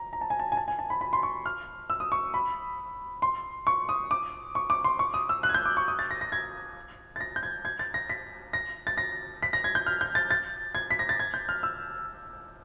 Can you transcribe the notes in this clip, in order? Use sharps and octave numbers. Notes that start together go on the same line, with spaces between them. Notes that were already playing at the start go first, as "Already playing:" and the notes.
Already playing: A#5
A#5
A5
G#5
A5
G#5
A5
G#5
A5
B5
B5
C6
C#6
F6
E6
D#6
C#6
B5
C6
C#6
D#6
D6
C#6
D6
C6
C#6
D#6
E6
F#6
G#6
G6
D6
C#6
D#6
A6
A#6
A#6
G#6
A6
A#6
G6
G#6
G#6
A6
A#6
B6
A#6
A6
A#6
B6
A#6
G#6
G6
F6
G6
A6
A6
G#6
B6
A#6
A6
G#6
G6
F6
E6